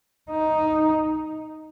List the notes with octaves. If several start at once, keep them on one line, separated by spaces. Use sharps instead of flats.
D#4